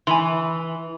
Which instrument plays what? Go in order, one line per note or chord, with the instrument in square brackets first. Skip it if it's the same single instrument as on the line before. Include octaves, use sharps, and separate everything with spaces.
[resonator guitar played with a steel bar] E3 [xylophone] G#5 B5 C6